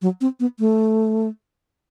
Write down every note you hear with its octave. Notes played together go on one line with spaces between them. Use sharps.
F#3
C4
B3
A3